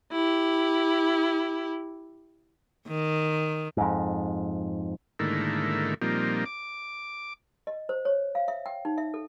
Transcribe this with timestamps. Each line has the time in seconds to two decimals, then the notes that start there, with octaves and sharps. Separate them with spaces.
0.12 E4 G4
2.88 D#3
3.77 F2 G#2
5.19 G#2 D3 D#3 A3 A#3 E4
6.02 A#2 F3 G3 A#3 C4 D#4
6.46 D6
7.67 D#5
7.89 C5
8.05 C#5
8.35 F5
8.48 E5
8.66 G5
8.85 D#4
8.98 E5
9.14 A4